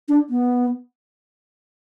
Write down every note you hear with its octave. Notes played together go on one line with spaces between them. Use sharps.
D4
B3